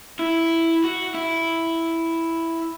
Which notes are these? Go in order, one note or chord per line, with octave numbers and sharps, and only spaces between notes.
E4
F#4
E4